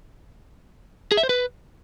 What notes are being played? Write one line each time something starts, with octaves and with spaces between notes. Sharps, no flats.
G#4
E5
C5
B4